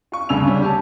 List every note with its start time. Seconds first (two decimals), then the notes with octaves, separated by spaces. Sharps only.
0.12 F4 C#6
0.29 D2 G2 C#3 G#5 E6 F7
0.47 G3 C#4
0.62 G4 G#5 A5